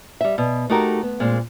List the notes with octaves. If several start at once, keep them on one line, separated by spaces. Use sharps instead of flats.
G3 E5
B2
A3 D#4 F#4 G4 A4 A#4
B3
A#2 G#3 C4